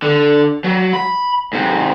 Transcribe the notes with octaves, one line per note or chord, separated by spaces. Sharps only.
D3
F#3
B5
G#2 C3